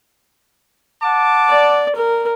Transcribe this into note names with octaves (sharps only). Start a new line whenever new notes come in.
F#5 A5 D6
D5
A#4